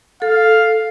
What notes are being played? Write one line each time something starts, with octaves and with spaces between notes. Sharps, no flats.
A4 F5